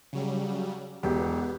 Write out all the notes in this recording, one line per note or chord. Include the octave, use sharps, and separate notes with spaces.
C#3 F#3 G3
E1 B3 G4